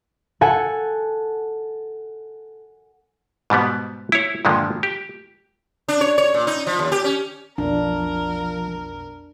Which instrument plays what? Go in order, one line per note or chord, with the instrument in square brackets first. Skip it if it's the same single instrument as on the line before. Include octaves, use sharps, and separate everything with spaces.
[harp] A4 F#5 G#5
[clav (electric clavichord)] G#2 B2 G3 B3
E4 C#5
G2 A#2 D3 D#3 F3 G#3
G4
[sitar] D4
C#5
C#5
A#2
D#4
F3
D#2
G4
C#4
[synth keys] B1 F2 [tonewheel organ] F3 [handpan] D4 [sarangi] A#4